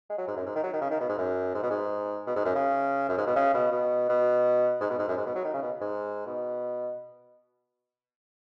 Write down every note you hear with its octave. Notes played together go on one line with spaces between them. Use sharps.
G#3
F#3
G#2
F#2
G#2
D#3
F#3
D#3
C#3
D#3
B2
G#2
F#2
G#2
B2
G#2
B2
G#2
F#2
C#3
F#2
G#2
B2
C#3
B2
B2
B2
G#2
B2
G#2
F#2
G#2
B2
F#3
D#3
C#3
B2
G#2
B2